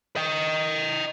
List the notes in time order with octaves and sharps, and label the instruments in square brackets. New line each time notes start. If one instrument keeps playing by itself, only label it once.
[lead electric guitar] D#5 G5